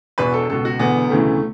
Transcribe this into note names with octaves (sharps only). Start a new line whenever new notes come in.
E1 E2 B2 B4
A4
C#2 B2 A4
F#4
E1 E2 D3 B3
E1 D2 C#3 E3 A3